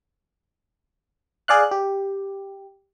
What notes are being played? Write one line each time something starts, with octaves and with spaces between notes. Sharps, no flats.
G#4 D5 F5 F#6
G4